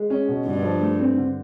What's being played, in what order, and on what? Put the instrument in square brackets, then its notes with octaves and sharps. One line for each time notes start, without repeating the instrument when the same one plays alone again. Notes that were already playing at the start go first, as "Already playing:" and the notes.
Already playing: [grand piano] G#3
C#4
B2
[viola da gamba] G2 [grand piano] D3
[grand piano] F3
A3
C4
D3